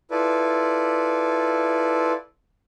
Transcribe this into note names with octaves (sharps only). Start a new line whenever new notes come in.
E4 F4 A4 B4 D5